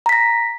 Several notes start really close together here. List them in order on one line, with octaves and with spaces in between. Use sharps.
A#5 B6 A#6